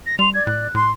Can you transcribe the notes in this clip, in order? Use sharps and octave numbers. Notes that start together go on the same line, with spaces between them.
A#6
G3 C6 F7
D5 G#6
A2 F#6
A2 C6